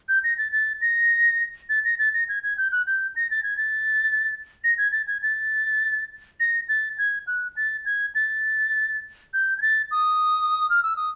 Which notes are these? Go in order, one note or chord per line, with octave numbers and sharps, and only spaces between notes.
G6
A#6
A6
A6
A#6
A6
A#6
A6
A#6
G#6
G#6
G6
F#6
G6
A#6
A6
G#6
A6
A#6
G#6
A6
G#6
A6
A#6
A6
G#6
F#6
A6
G#6
A6
G6
G#6
A6
D#6
F6
E6
D#6